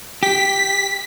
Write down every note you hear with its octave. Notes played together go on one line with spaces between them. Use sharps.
G4 B6